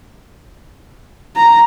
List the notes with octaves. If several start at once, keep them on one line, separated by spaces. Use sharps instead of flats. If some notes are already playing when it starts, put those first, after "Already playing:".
A#5